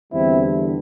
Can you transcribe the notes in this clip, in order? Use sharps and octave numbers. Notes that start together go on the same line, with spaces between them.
E2 D3 G3 C4 E4